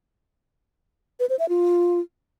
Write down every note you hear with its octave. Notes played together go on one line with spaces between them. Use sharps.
B4
C5
E5
F4